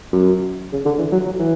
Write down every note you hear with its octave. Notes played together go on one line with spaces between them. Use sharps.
F#2
C#3
D3
E3
F#3
F#3
E3